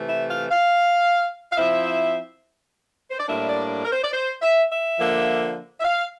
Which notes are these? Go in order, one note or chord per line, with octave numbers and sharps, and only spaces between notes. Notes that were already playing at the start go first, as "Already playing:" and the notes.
Already playing: C3 E3 A3
E5
F5
F5
F5
F3 C4 E4 E5
C5
D5
A2 G3 A#3 D4 E5
D5
A#4
C5
D5
C5
E5
E5
D3 F3 A#3
E5
F5